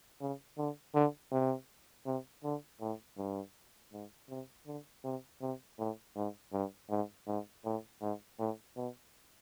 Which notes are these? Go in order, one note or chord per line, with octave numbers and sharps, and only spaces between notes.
C#3
D3
D3
C3
C3
D3
A2
G2
G#2
C3
D3
C3
C3
A2
G#2
G2
G#2
G#2
A2
G#2
A2
B2